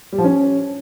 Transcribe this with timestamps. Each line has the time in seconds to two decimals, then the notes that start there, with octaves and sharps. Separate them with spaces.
0.12 G3
0.18 F3
0.24 C#4